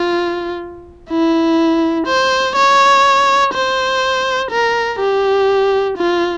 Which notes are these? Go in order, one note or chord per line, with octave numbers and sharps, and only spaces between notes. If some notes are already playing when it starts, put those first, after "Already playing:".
Already playing: F4
E4
C5
C#5
C5
A#4
G4
F4